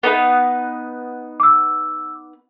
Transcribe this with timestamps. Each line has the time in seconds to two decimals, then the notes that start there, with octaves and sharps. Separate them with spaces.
0.03 B3 D#4 B4
1.40 D6 E6